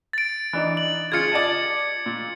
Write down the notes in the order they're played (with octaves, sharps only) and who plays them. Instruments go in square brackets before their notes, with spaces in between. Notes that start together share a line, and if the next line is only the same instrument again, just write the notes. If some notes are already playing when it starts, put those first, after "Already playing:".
[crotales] A6 D7
[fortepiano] E3 D4 D#4
[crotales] F#7
[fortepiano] C#3 F4 [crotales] G#6 C#7
[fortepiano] D5 D#5 A5
A#2